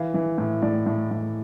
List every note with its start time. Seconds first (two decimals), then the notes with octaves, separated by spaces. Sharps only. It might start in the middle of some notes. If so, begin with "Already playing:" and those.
Already playing: E3 F5
0.14 E3
0.38 A2
0.62 A2 D5
0.86 A2
1.11 A2